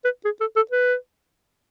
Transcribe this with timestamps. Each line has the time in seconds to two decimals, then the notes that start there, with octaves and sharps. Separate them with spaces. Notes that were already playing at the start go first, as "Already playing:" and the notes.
0.04 B4
0.25 G#4
0.40 A4
0.56 A4
0.71 B4